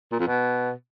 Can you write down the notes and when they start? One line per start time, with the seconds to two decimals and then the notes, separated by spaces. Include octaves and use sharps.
0.12 A#2
0.20 F2
0.27 B2